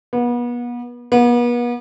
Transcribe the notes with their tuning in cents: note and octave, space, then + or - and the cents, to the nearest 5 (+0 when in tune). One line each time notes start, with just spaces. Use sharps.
B3 -35
B3 -40